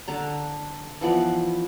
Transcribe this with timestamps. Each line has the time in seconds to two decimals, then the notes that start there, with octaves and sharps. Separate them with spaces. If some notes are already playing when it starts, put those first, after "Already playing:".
0.08 D3 A5 A#5
1.01 E3 F3 B3 D5